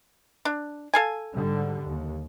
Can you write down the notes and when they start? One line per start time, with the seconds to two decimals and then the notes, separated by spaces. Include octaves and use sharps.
0.45 D4
0.94 A4 F5 G#5
1.34 G#2 D3 G3
1.86 D#2